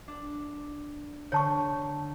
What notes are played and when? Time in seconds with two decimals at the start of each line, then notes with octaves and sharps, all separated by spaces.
0.08 D4
1.32 D3 C#5 A5 C#6